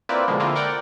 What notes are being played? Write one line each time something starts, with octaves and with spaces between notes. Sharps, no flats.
A#3 C4 E4 F4 B4 D5
B2 D3 F3 G#3 A#3
D3 A#3 C4 E4 F4
A#4 D5 F#5 G5